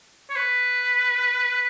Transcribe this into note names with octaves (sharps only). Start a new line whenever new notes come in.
C#5
B4